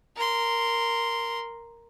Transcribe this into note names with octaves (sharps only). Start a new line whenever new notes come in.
A#4 C6